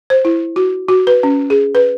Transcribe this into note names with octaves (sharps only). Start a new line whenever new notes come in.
C5
E4
F#4
F#4
B4
C#4
G#4
B4